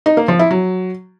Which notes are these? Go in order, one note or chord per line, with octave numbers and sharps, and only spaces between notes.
D#4
A#3
F3
E4
F#3